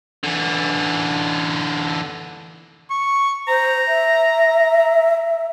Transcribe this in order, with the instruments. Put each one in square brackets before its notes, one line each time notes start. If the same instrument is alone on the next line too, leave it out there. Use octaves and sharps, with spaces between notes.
[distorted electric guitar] D3 E3
[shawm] C#6
[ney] C5 [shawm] A#5
[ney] E5